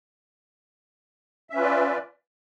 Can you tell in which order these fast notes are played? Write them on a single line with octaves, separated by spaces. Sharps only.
E5 C#4 B4 F4 D5